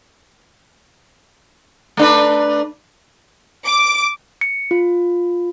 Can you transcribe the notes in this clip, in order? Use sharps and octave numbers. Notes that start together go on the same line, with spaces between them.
A3 D4 B4
D6
C#7
F4